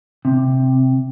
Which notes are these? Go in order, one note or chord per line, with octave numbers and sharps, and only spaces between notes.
C3